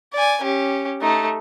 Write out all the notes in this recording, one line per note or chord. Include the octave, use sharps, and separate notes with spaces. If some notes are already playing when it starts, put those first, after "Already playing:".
D5 G#5
C#4 G4
A3 D#4